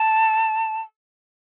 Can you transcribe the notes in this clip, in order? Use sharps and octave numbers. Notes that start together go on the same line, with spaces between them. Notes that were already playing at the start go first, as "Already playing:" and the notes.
Already playing: A5